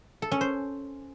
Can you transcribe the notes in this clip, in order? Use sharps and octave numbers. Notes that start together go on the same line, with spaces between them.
A4
C#4
C5